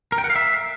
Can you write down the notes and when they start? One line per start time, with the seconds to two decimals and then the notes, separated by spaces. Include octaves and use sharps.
0.12 A#4
0.18 G5
0.24 F#5
0.30 F5
0.36 E5